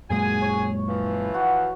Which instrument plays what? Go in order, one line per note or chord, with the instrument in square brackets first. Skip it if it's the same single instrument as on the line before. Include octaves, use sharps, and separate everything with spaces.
[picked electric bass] F#2 A#2 G#3 [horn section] F#4 G#4 G#5
[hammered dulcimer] C#5
[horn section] E3 F3
[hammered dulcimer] F#4